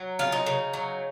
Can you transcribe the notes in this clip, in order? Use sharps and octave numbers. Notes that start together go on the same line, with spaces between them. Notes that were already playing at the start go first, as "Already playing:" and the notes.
Already playing: F#3
C#3 F4
D#4
C#3
F#3